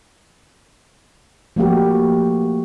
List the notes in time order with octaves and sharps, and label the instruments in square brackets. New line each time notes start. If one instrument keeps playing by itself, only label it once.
[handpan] F3 A3 A#3 F#4 G4